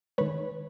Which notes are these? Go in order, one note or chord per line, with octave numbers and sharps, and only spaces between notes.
D#3 G#3 B4 C#5